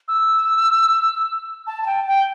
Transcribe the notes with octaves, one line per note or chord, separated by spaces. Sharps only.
E6
A5
A5
G5
G5